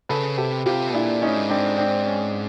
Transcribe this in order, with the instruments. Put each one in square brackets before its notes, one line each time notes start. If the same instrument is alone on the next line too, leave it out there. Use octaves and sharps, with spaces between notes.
[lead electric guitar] C#3 [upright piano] A4 B4
[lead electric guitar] C3 [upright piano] G4 A4
[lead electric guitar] C3 [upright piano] F4 G4
[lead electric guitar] B2
[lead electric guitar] A#2 [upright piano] D4 E4
[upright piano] C#4 D#4
[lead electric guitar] A2
G#2
[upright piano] C4 D4
C4 D4
C#4